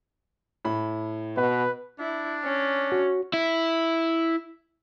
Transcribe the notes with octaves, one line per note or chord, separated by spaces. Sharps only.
A2 B5
B2 B4
D4 E4
C#4
F#4
E4